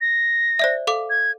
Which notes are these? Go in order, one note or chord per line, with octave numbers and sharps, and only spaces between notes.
A#6
C5 D5 E5
A4 F5 D6
G#6